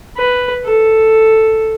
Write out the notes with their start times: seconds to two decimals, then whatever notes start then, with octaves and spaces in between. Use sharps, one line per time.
0.17 B4
0.65 A4